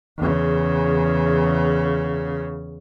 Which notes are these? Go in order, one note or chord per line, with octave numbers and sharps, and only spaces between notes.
E2 C#3